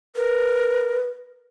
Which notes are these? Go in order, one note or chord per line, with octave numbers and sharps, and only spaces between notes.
A#4 B4